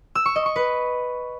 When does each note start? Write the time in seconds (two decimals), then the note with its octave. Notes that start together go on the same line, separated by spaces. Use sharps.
0.15 E6
0.25 C#6
0.36 D#5
0.46 C#6
0.56 B4